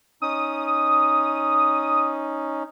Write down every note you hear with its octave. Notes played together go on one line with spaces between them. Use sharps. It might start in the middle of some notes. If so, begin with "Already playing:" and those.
C#4 D#4 D#6